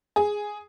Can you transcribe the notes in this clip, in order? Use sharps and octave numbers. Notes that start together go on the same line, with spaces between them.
G#4